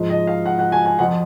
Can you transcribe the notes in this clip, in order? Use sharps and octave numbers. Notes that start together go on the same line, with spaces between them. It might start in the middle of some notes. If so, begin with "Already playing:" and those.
Already playing: G#2 F3
D#5
F5
F#5
F#5
G#5
G#5
F2 F3 F#5